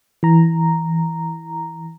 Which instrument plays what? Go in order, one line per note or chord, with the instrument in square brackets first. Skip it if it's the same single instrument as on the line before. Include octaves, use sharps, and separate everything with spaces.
[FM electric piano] E3 A#5